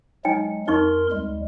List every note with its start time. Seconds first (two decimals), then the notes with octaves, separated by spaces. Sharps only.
0.25 F#3 G#3 D#4 G5 G#5
0.68 F2 D#4 A#4 C6 C#6
1.12 D2 G3 G#3